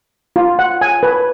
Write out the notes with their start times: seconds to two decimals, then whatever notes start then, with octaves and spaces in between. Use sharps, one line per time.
0.36 F4
0.59 F#5
0.81 G#5
1.03 B4